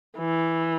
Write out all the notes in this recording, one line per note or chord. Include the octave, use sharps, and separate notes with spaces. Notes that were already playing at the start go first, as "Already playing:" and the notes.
E3